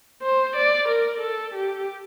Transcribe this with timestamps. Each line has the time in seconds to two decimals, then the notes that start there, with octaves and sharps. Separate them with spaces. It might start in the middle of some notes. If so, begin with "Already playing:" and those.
0.23 C5
0.56 D5
0.88 A#4
1.20 A4
1.54 G4